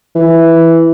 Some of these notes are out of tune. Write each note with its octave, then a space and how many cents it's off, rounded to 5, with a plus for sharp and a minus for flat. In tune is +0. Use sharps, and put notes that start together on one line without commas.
E3 +0